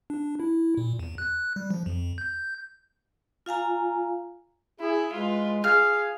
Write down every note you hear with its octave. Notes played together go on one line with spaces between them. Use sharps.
D4
E4
A#2
E2
F#6
G3
F3
F2
G6
F4 F5 G#5 A#5
E4 G#4
G#3 F4 B4
G#4 F5 F6